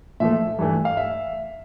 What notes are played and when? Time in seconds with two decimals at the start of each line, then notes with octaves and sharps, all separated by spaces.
0.20 A#2 F3 A3 E5
0.59 G2 E3 A3
0.85 F5
0.97 E5